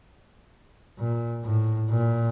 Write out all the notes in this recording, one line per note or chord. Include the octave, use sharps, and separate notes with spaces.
A#2
A2
A#2